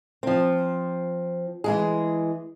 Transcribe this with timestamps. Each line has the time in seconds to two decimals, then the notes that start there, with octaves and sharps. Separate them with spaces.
0.23 F3 C4
1.64 E3 G#3 G#4